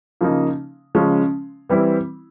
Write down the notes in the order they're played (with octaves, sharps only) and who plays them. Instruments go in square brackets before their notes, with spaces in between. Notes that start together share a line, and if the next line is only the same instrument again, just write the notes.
[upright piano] C#3 F3 A#3 D#4
C#3 F3 G#3 C#4
E3 G3 C4 E4